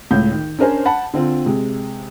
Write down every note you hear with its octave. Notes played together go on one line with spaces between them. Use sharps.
C#2 A2 G6
D#3
C#4 D4 A#4 C5 G#5
F#5 A5 B5
D3 C4 F4
C3 G#3